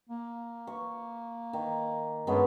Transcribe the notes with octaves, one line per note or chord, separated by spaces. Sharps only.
A#3
C#6
D#3
G2 G#3 B3 C#4